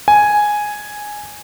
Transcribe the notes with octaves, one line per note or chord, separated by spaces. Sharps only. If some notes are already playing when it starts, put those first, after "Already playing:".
G#5